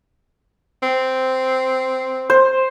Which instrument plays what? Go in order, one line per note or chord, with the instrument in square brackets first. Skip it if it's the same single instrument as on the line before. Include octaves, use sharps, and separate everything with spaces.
[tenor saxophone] C4
[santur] C5